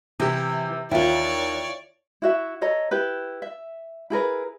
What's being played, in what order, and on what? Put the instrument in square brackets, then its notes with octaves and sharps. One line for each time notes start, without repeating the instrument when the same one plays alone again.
[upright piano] C3 G4 [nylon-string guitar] E3
[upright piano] D#2 [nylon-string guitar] E4 F4 [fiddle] C#5 D5
[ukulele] E4 F#4 E5
A4 C#5 D#5 A#5
E4 G4 B4
E5
E4 G#4 A#4 B4